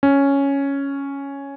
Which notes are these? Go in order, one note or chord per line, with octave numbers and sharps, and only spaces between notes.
C#4